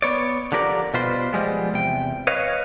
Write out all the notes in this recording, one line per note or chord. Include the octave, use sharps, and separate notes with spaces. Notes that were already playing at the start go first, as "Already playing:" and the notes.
B3 C#5 D5
D3 F3 G4 A#4 C#5 D5
B2 G3 F4 B4 C5 C6
F3 G3 G#3 B3
E2 C3 G5
B4 C#5 D#5 F5